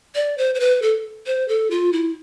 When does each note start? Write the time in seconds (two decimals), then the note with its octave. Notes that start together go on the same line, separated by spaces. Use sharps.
0.15 D5
0.38 C5
0.55 C5
0.60 B4
0.82 A4
1.26 C5
1.48 A4
1.71 F4
1.93 E4